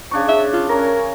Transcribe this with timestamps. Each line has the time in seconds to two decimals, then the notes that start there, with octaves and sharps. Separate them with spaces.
0.11 C#3 D4 C#6
0.28 E5
0.53 F4
0.69 C#4 A#4 A#5